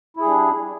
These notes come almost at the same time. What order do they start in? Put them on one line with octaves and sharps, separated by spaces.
E4 G#4 G3 D4